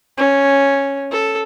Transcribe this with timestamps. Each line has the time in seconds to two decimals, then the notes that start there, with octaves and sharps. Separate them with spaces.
0.18 C#4
1.11 A4